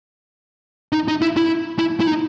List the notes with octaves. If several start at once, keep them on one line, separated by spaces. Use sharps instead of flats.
D#4
D#4
E4
E4
E4
E4
D#4